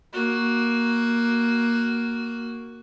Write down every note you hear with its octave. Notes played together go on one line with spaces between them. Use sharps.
A#3 F#4